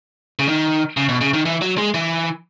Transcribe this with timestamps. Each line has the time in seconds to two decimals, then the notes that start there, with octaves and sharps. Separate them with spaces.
0.39 C#3
0.48 D#3
0.97 C#3
1.09 B2
1.21 C#3
1.33 D#3
1.45 E3
1.61 F#3
1.78 G#3
1.94 E3